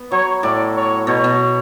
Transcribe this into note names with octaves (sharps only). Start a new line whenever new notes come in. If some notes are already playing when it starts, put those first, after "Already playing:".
Already playing: B3
F#3 C#5
A2 D5
C#5
B2 C#5
B2